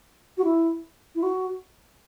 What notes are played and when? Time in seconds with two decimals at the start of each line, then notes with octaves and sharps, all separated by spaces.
0.38 F#4
0.44 E4
1.15 E4
1.23 F#4